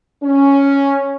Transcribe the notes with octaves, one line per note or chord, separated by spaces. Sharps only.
C#4